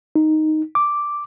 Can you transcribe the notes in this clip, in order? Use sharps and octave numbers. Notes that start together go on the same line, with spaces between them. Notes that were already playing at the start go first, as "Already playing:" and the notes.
D#4
D6